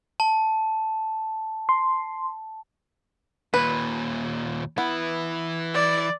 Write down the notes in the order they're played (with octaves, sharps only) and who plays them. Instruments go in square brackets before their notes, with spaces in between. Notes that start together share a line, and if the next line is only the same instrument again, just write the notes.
[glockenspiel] A5
[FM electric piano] C6
[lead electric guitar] D#2 A#2 [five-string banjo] B4
[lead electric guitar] E3 E4 [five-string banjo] B3
[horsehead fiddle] D5